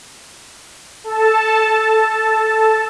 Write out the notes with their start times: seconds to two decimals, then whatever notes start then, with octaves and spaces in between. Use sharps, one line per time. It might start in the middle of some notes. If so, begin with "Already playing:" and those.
1.04 A4 A5